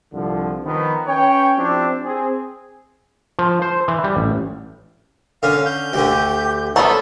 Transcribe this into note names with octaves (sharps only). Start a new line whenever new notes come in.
C2 G2 D3 F3
D#3 F3 B3
C#4 B4 C#5 G5
F3 C4 D4 E4 G4
C4 G#4
F3
C5
E3
G3
A1
D3 C#4 F5
G6
D2 D3 G4
F#3 G3 B3 A4 C5